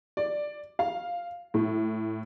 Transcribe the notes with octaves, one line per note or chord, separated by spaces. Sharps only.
D5
F5
A2